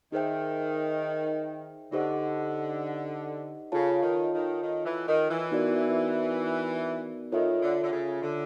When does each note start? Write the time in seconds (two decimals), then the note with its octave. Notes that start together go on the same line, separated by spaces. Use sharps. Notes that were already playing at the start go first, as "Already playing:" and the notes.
0.12 D#3 D#4 G#4 C5 E5 G5
1.92 D3 D#4 G4 C5 D#5 F#5
3.72 C#3 F4 A4 C#5 F5 A5
4.02 D#3
4.33 D#3
4.62 D#3
4.85 E3
5.07 D#3
5.30 E3
5.52 B3 D#4 F#4 A#4 D5
7.32 D#3 F4 A4 C#5 E5
7.62 D3
7.83 D3
7.92 C#3
8.22 D3